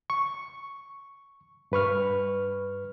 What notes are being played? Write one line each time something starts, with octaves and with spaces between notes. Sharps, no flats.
C#6
G2 B4 C#6 F6